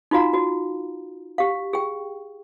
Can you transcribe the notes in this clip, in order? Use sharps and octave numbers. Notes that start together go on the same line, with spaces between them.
D#4 F4 F#4 F5 A#5
F#4
G4 F5
G#4 G5